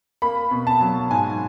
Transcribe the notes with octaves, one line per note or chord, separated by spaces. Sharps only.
A#3 B5
B2
A5
F#3
G#2 G#5